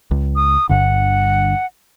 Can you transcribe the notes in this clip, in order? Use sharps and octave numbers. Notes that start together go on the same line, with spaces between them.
C#2
D#6
G1 G2 D3 F#5